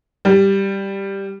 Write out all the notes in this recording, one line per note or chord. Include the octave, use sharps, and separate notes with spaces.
G3